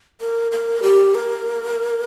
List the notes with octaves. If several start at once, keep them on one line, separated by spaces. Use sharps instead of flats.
A#4
A#4
G4
A#4